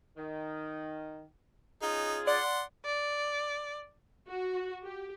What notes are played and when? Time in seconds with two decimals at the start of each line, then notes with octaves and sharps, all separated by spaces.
0.17 D#3
1.82 C#4 D#4 F4 G#4
2.27 D5 F#5 C6
2.85 D5
4.27 F#4
4.84 G4